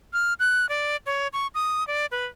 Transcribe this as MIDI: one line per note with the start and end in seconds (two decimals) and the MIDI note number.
0.13 0.34 89
0.40 0.69 90
0.69 0.97 74
1.06 1.28 73
1.33 1.47 85
1.55 1.86 87
1.87 2.06 74
2.11 2.25 71